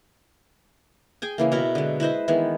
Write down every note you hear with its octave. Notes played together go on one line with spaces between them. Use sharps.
G#4 G5 G#5
C#3 E3 A#3
B2 E4 F#4 A#4
D3 G#3
E4 B4 C5 D#5
D#3 E3 G#3 B3